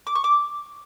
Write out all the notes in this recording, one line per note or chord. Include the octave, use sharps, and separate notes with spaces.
D6
C#6
D6